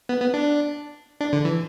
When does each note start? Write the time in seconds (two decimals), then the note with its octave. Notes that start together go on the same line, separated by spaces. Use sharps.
0.09 B3
0.21 B3
0.34 D4
1.21 D4
1.33 D3
1.45 E3